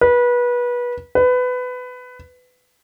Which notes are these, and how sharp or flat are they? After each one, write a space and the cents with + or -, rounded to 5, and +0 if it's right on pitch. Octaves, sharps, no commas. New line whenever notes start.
B4 -25
B4 +20